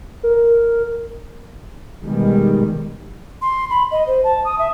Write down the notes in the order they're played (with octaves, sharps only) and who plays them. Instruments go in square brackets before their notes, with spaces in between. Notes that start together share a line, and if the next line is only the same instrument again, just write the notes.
[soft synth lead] A#4
[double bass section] B2 D#3 G3 G#3
[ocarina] C6
B5
D#5
C5
A5
D#6
E5